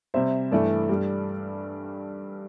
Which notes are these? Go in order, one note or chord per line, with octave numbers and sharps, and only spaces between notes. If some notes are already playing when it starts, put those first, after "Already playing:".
C3 G3 C5 E5
G2 E3 A3 A4 D5
G2 G3